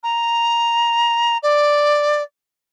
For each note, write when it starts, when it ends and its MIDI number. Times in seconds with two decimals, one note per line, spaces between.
0.03 1.38 82
1.43 2.23 74